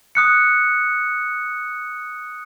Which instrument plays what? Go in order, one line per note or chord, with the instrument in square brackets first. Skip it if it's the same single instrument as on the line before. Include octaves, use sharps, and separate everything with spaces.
[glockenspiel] D#6 F#6 C#7